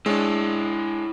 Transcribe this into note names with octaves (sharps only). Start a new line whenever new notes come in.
G#3 D4 E4 C#5